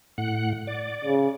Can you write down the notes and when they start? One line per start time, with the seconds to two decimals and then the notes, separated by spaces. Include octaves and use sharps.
0.18 A2 F#5
0.67 D5
1.04 C#3